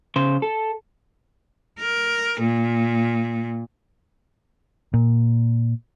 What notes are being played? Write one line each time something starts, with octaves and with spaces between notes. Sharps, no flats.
C#3 C5
A4
A#4
A#2
A#2